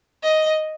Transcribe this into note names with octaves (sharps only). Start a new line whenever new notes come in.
D#5